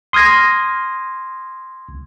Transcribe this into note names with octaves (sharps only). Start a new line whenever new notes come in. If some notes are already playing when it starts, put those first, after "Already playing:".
C6 D#6 F6 G#6 A#6